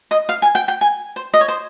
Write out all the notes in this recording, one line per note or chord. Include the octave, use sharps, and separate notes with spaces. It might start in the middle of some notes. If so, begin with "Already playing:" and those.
D#5
F5
G#5
G5
G5
G#5
C5
D#5
C#5
C5